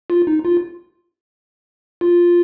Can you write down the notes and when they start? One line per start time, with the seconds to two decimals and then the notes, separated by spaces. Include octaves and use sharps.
0.10 F4
0.27 D#4
0.45 F4
2.01 F4